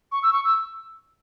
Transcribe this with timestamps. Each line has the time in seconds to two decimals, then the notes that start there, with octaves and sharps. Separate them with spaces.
0.12 C#6
0.23 E6
0.33 C#6
0.45 E6